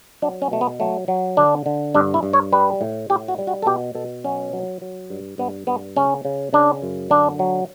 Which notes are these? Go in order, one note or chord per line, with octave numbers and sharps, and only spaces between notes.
F#3 D4
C#4
B2 A3
B3
F#3 A3
F#3
D3 D4
D3
G2 D4
E4
G2
C#5
G3 B4
A2
A2 G4
F#4
G3
F#4
A4
B2 G4
B2 A4
F#3 C#4
F#3
F#3
G2
G2 B3
G2 B3
C#3 C#4
C#3
C#3 D4
F#2
D3 D4
F#3